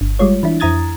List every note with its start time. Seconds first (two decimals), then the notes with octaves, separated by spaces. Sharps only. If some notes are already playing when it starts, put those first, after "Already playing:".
0.01 G1
0.19 G3 G#3 F4 C#5
0.43 E3 D4 E4
0.60 F2 E4 A#5 D#6 G#6 A6